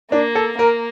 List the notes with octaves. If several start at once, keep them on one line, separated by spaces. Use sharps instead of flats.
A#3 D4
A4
A#3 A#4